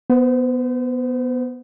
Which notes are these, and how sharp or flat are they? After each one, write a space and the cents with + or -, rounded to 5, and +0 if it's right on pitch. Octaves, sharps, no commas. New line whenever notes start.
B3 +0 C5 -35